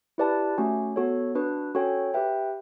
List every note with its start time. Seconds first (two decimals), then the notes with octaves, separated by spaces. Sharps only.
0.18 E4 G4 B4 D5 A5
0.58 A3 C#4 F#4
0.96 B3 F#4 A4 C#5
1.35 D4 F#4 B4
1.75 C#4 F#4 A4 C#5 G5
2.14 G4 B4 E5 G5